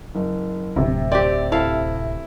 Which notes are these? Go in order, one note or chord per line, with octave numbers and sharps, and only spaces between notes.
F#1
D1 C3
C4 G4 D5
E4 A4 F5